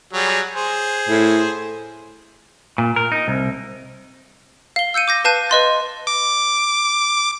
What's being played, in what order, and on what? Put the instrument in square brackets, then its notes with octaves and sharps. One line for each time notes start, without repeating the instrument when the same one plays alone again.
[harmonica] F#3 G3 G#4
G#4 C5
[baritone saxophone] A2
[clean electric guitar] A#2
A#4
D#4
C2
[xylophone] F5 G7
E6 G6 C#7 D#7
D6 G6 A#6
B4 F5 A5 F#6 G6 D#7
B4 D#5 C6 A6
[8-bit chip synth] D6